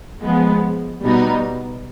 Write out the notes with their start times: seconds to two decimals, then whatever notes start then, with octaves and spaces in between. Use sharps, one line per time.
0.22 F3 G#3 B3
1.02 B2 G3 B3 D#4